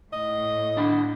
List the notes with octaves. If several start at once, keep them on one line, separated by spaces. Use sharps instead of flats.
A2 D#5
D4 F#5 B5